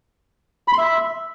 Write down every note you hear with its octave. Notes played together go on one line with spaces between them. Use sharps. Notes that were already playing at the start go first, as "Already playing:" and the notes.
B5
C6
E5